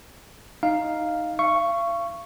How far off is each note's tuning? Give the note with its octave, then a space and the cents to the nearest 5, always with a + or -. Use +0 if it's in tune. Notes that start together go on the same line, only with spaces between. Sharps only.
D#4 +0 F5 +0
F5 -40 C#6 +0